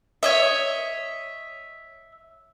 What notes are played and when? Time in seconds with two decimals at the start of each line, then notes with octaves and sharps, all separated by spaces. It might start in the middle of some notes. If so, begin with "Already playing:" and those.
0.23 C#5 D#5 E5